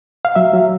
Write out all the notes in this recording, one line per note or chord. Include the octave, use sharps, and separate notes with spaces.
F5
F#3 E5
F#3